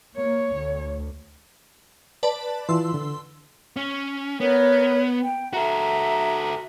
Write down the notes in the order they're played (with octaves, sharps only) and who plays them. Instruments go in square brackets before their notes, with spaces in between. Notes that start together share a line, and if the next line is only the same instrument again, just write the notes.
[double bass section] A#3 [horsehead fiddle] C#5
[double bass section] D2
[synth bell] B4 D5 A5
[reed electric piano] E3 F4 [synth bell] C6 E6
[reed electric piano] D3
[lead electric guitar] C#4
[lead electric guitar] B3 [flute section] A#4 C#5
[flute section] G5
[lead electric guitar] F#4 A4 [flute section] E5 A#5